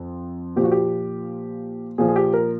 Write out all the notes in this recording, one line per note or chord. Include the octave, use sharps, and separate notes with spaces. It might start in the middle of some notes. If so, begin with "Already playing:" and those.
Already playing: F2
A#2 F3 G4
F#4
G4
A#2 F3 G#4
G#4
G4
A#4